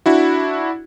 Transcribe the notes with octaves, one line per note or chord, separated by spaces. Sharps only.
D4 E4 F#4